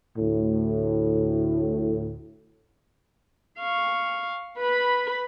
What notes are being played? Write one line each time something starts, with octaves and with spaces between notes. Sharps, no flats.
D2 A2
F5 C#6
B4 B5